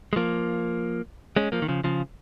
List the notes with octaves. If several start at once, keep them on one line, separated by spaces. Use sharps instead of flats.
G#3
F3 A#3
G#3 C#4
F3 A#3
D#3
C#3 F3
C#3 F3